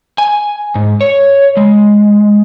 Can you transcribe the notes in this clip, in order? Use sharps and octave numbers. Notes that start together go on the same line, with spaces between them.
G#5
G#2
C#5
G#3